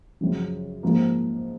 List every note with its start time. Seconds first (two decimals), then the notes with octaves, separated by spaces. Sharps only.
0.21 F#2 C#3 F3
0.83 G#2 F3 A#3